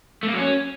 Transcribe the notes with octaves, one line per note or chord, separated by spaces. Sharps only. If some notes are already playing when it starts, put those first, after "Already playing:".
A3
A#3
F#3
C#4